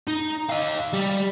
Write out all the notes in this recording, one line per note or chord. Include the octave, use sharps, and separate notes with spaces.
D#4
D#5 F5
G3